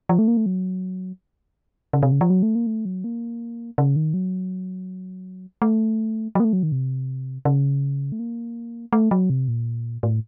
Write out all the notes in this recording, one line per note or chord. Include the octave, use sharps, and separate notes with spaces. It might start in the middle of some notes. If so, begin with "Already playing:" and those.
F3
A3
A#3
A3
F#3
C#3
C3
C#3
F3
F#3
A3
A#3
A3
F#3
A#3
C#3
D#3
F#3
A3
F#3
A#3
A3
F#3
D#3
C3
C#3
A3
A#3
A3
F#3
C3
A#2
A2